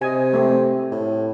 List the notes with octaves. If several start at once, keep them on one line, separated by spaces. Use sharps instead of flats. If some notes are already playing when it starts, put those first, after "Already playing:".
C3 D#5 G#5
A3 C4
A2